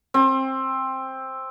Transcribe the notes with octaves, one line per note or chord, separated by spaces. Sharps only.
C4